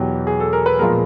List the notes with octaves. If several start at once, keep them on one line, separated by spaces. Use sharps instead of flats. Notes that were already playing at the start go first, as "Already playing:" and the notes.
Already playing: E2 B2 F#3 G4
G#4
A4
A#4
B4
A#2 F3 G#3 B3 A#4